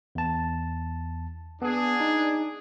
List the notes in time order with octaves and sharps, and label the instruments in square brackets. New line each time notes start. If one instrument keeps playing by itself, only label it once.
[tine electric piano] E2 A5
[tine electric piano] B3 [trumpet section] D4 G#4
[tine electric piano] D#4